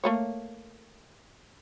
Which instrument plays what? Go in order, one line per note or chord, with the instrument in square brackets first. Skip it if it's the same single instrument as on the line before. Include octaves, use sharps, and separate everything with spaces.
[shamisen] A3 A#3 C#5